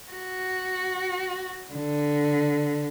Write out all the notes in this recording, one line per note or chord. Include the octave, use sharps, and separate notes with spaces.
F#4
D3